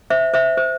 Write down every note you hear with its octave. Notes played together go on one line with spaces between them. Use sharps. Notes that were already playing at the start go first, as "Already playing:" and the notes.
C5 E5
C5 E5
C5